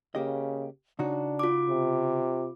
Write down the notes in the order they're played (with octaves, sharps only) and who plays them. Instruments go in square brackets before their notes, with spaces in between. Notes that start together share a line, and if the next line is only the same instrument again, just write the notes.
[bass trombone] C#3 [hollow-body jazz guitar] A#3 G4 D#5
[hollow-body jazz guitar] C#3 D#4 F#4 [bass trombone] D4
[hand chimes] F4 D6
[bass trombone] C3